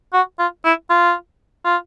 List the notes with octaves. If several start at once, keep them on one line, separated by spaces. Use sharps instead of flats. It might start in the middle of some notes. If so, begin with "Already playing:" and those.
F#4
F4
E4
F4
F4